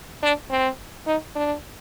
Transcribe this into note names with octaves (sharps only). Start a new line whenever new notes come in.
D4
C4
D#4
D4